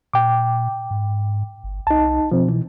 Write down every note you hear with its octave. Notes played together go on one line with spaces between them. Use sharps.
A#2 G5 D6
G#2
G1
C2 D#4 A5
B2 F3 C4
E3